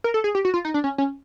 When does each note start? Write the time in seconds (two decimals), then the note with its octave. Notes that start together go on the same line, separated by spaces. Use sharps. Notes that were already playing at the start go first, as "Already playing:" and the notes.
0.04 A#4
0.14 A4
0.24 G#4
0.35 G4
0.45 F#4
0.54 F4
0.65 D#4
0.74 D4
0.84 C#4
0.98 C#4